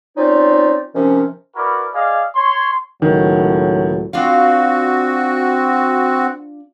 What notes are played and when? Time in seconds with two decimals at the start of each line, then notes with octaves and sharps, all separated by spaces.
0.17 C4 C#4 D#4 F4 C5 D5
0.94 C3 D#3 F3 C#4
1.56 E4 F#4 A#4 B4 D5
1.94 G#4 D5 D#5 F5
2.35 C#5 C6
3.02 C#2 A2 D#3 F#3
4.13 C4 D4 F4 F#4 F5